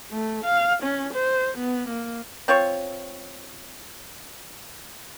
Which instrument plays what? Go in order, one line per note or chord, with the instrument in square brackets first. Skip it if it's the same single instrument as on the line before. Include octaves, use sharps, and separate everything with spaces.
[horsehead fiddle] A3
F5
C#4
C5
B3
A#3
[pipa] C4 F4 C#5